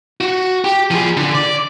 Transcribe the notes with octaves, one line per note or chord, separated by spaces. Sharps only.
F#4
G4
F3 G#4
D3
D5